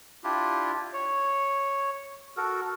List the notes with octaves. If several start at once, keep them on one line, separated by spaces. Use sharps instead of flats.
D4 E4 F4 G4
C#5
F#4 A4 A#4